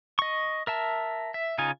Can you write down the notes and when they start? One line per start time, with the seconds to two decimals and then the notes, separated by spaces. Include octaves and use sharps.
0.19 D#5 C#6
0.67 A#4 E5 A5
1.34 E5
1.58 C#3 D#4 F4 G#5